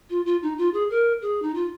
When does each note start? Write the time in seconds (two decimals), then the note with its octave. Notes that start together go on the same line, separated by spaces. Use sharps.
0.10 F4
0.25 F4
0.42 D#4
0.58 F4
0.73 G#4
0.90 A#4
1.21 G#4
1.42 D#4
1.54 F4